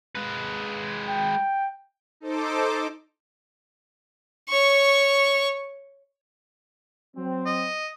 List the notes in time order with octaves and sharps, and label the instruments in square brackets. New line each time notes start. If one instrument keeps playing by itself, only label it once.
[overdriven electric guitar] G#3 B4
[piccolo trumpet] G5
[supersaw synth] D#4 A4 C5 D6
[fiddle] C#5 C#6
[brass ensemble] F#3 C4
[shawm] D#5